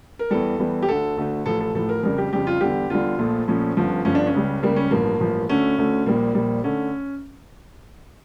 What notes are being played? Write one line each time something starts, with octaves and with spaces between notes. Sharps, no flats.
A#4
E2 E3 G3 A4
E2 E3 G3
G4
D2 D3 A3 A4
D2 D3 A3
A1 A2 F3 A4
A4
A1 A2 F3 A4
A#4
F2 C#3 G3 A#4
G4
F2 C#3 G3 G4
F4
E2 D3 G3 G4
E2 D3 G3 F4
A#1 A#2 F3 A3
A#1 A#2 F3 A3 C#4
G1 G2 F3
G1 G2 F3 C#4
D4
C#4
C#2 C#3 G3
C#2 C#3 G3 A#3
C#4
A1 G2 F3 A#3
A1 G2 F3
D2 D3 A3 C#4
D2 D3 A3
A#1 A#2 G3 A#3
A#1 A#2 G3
D3 A3 C#4